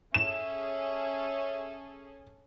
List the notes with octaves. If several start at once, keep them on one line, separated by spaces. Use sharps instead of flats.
C#4 G#4 A4 E5 E7